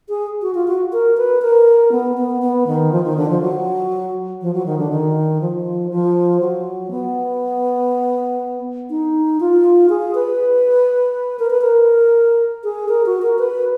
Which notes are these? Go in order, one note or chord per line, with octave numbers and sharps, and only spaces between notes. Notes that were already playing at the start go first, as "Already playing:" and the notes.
G#4
F#4
F4
F#4
A#4
B4
A#4
B3
B3
B3
D#3
F3
D#3
D3
F3
F#3
F3
F#3
D#3
D3
D#3
F3
F3
F#3
B3
D#4
F4
G#4
B4
A#4
B4
A#4
G#4
A#4
F#4
A#4
B4